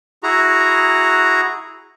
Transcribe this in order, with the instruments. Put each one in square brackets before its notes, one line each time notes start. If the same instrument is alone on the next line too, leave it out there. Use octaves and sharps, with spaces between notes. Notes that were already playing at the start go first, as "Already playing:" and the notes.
[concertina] E4 F#4 G#4 A#5